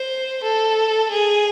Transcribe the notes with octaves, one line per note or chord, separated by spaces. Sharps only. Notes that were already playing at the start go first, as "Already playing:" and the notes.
Already playing: C5
A4
G#4